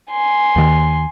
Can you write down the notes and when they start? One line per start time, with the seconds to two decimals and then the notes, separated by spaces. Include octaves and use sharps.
0.10 G#5 C6
0.56 D#2 D#3